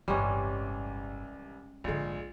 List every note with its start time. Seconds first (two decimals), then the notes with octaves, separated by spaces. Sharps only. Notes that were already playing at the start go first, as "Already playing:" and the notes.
0.08 G1 C2 A2 E3 G3 G#3 C#4
1.84 A#1 G#2 D3 G#3